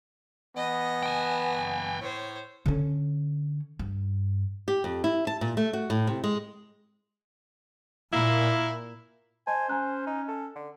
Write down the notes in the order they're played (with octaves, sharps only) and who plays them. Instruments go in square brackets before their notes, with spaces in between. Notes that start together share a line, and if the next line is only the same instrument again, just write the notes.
[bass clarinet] E3 [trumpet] B3 [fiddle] D#5
[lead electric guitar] G5 G#5
[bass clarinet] A2 [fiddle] C5 C#5
[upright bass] D3 C#4
G2
[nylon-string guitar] G4
F2
E4
A5
A#2
A3
F#4
A2
C3
G#3
[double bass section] A#2 [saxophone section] A#3 E4
[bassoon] C5 [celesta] D#5 A5 [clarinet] G#5
[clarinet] C#4 [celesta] G#5 A#5 F#6
[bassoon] D#4
A4
D3